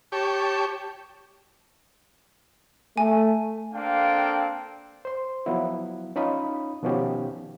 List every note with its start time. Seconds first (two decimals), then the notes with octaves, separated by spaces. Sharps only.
0.12 G4 C#5 A5
2.98 A3 G#5
3.74 A#3 C4 D4 A4 F5 G5
5.05 C5 C6
5.46 F3 F#3 B3 E4
6.16 C#4 D#4 F4 B5 D#6
6.83 B2 D#3 F3 B3 C#4 G4